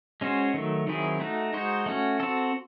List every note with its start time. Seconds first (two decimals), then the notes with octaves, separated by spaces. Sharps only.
0.21 G#3 C#4 F#4 C5
0.54 D#3 F#3 A3
0.87 D#3 F#3 C4 E4 G#4
1.20 A3 D#4 F#4
1.54 G#3 D#4 F#4 C5
1.86 A3 C#4 F#4
2.20 C4 F#4 A4